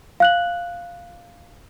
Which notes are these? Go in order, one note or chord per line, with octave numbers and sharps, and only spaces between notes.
F5 F#6 F#7